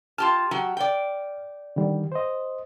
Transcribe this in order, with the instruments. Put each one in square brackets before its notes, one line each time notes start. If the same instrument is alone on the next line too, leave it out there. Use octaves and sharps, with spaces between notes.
[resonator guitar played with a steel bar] F4 G4 A5 [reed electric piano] F6
[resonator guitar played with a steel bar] F#3 F#4 G4
D5 G5
[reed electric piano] D3 D#3 G3
C5 D#5